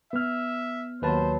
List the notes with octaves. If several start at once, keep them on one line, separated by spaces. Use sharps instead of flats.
B3 E5 F6
D#2 F#3 B4 C5 A5